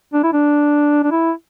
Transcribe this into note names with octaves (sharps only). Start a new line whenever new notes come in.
D4
E4
D4
D4
E4